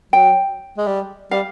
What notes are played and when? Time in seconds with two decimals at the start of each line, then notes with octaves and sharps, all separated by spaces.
0.13 F#3 G5
0.78 G#3
0.87 G3
1.31 G3 F5